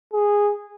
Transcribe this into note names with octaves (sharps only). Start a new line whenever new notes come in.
G#4